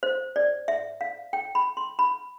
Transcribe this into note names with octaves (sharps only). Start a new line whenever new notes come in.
C5
D5
E5
F5
G5
B5
C6
B5